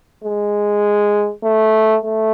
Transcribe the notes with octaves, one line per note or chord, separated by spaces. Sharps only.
G#3
A3
A3